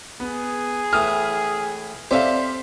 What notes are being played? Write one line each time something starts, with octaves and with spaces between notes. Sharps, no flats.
B3 G#4
A2 E3 D#6 F6
C4 G4 A4 C5 D5 E5 F5 B6